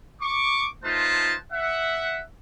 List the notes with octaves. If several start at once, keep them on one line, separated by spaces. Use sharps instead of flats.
C#6 D6
A3 D#4 F4 B4 C5 A5
E5 F#5